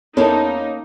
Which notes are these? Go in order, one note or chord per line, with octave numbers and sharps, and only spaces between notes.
E2 A#3 C#4 D#4 A4 A#4 C#5